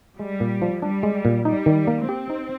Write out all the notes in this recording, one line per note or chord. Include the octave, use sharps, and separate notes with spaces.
G3 G#3
A#2
F3
G3 D4
G#3
A#2
G3 D#4
D#3
A#3
C4 G4
D#4